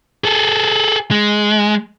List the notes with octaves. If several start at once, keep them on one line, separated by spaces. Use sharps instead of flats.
G#4 A4
G#3